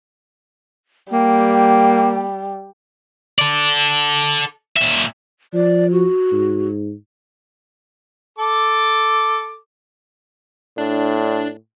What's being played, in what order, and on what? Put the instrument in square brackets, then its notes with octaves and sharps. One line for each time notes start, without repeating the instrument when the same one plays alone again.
[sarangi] G3 [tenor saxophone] A#3 [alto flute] G5
[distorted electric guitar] A4 D5
A#2 E5
[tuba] F3 [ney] D5
[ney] F#4
[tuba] G#2
[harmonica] A4 D6
[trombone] A2 [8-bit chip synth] D4